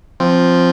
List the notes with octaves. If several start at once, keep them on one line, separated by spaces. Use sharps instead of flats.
F3 C4